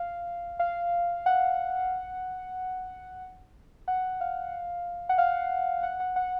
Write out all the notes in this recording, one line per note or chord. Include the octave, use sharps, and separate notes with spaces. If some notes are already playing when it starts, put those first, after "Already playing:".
Already playing: F5
F5
F#5
F#5
F5
F#5
F5
F#5
F#5
F#5